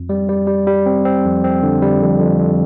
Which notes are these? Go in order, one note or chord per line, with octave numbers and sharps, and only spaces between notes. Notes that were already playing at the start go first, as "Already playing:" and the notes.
Already playing: F2
G3
G3
G3
G3
C4
C4
F2
C4
D3
G3
F2
F2
F2